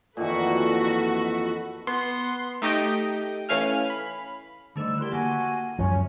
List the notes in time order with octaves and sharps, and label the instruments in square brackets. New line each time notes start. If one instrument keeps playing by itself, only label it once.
[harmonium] F2 A4 [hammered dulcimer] A#2 D#3 E3 [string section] F#4 B4
[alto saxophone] B3 [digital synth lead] C6
[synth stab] A3 D#4 G4 D#5 G5
E3 A3 C#4 F5 G#5 F6
B5
[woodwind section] G#2 G3 E6 [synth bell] D3 A3 E7
[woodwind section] E2 E4 A#4 [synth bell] G4 C6 F#6
[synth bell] D3 A#3 [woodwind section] F#4 G#5
[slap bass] F#2 F3 [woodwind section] C#4